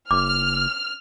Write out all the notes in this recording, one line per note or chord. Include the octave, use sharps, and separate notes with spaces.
F#1 D6 F6